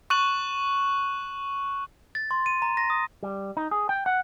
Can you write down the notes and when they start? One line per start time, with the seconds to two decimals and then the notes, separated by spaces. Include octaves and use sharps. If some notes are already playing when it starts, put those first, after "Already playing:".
0.10 C#6 F#6 D#7 F#7
2.15 A6
2.31 C6
2.46 D#7
2.62 A#5
2.77 A#6
2.90 D#6
3.23 G3
3.57 D#4
3.71 G#4
3.89 G5
4.06 F#5